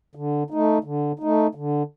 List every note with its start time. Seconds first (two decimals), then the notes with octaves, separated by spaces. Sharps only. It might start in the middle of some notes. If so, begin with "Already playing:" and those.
0.15 D3
0.50 A3 D#4
0.84 D3
1.19 A3 D#4
1.55 D3